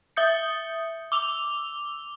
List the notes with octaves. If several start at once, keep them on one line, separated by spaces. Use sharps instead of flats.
E5 D#6 G6 C#7
D6 E6 F7 G7